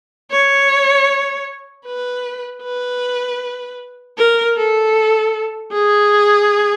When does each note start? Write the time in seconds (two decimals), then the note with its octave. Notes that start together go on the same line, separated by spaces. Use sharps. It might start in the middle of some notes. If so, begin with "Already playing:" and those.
0.31 C#5
1.86 B4
2.63 B4
4.17 A#4
4.56 A4
5.72 G#4